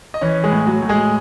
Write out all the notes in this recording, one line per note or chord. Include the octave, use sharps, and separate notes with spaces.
D#5
E3 C#4 C#5
G#3 G#4
A2
F#3 F#4
A2
G#3 G#4